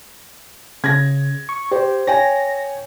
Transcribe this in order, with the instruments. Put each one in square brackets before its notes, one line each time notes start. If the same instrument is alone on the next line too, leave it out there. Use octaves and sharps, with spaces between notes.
[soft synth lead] C#3 [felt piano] G#6 A#6
[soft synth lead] C#6
[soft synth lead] G4 [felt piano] C5
[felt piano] C#5 G5 G#5 [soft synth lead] A#6